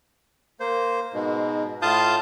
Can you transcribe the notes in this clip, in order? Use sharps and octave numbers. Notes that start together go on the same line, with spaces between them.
A#3 C5
G#2 B2
A2 F4 F5 A5 D#6 G6